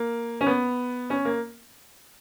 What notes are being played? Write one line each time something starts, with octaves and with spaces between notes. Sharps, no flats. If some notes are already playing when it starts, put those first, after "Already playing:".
Already playing: A#3
C#4
B3
C#4
A#3